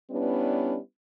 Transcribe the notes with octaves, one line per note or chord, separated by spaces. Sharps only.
G3 B3 C#4 D4 E4 B4